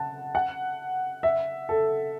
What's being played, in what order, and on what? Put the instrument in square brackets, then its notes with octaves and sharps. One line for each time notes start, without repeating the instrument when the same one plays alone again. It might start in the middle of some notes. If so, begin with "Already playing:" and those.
Already playing: [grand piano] F#5 A5
F#5
E5
A4